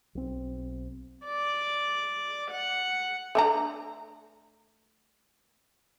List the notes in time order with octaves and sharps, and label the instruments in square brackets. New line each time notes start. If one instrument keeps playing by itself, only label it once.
[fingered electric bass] B1 C4
[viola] D5
F#5
[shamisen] A3 D4 A#5